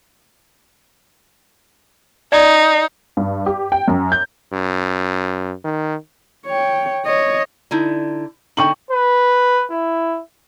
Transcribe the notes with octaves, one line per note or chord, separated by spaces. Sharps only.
D#4 D5
G2
G4
G5
F#2
G6
F#2
D#3
C#5 G5
C#5 D#5
D3 D#4 E4
D3 D#4 G5 C#6 F#7
B4
E4